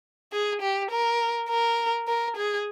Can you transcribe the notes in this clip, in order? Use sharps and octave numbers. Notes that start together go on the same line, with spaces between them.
G#4
G4
A#4
A#4
A#4
G#4